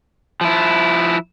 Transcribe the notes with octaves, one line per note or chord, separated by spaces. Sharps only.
F3 E4